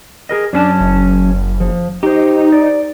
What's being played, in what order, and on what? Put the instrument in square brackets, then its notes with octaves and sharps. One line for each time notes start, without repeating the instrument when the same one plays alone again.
[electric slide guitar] G#4 A#4 D#5
[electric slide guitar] F#2 C#4 A5 [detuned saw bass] D4
[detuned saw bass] F#1
[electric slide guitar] F3
[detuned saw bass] D#4 [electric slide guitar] G4 C5
[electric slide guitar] D5